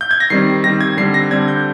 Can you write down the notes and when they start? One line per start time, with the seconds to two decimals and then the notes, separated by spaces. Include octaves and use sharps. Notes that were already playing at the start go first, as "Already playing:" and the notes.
0.01 G6
0.11 G#6
0.20 A#6
0.30 D#3 G3 C4 C7
0.64 D#3 G3 C4 A#6
0.81 G#6
0.97 D3 G3 C4 C7
1.14 A#6
1.31 D3 G3 C4 G#6
1.48 G6